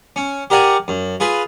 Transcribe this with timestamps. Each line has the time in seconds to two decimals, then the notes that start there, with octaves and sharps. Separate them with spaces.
0.16 C#4
0.50 G4 A#4 D5 F#5 G#5
0.88 F#2
1.20 F4 G#4 B4